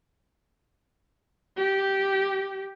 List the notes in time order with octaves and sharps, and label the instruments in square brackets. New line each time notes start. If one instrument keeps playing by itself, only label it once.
[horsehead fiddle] G4